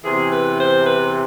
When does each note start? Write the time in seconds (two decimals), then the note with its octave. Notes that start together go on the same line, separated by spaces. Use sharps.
0.04 E2 C3 E3 G#4
0.32 B4
0.59 C5
0.87 B4